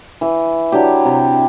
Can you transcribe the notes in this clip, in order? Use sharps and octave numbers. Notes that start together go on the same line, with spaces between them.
E3 E5
F#3 D4 E4 G4
C3